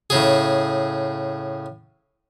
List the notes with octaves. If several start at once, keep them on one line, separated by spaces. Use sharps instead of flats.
A2 C#3 G#4